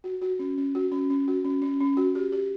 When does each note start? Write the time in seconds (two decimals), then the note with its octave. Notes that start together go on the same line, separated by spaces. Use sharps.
0.04 F#4
0.21 F#4
0.39 C#4
0.58 C#4
0.75 F#4
0.92 C#4
1.10 C#4
1.28 F#4
1.44 C#4
1.62 C#4
1.80 C#4
1.97 F#4
2.15 G4
2.32 G4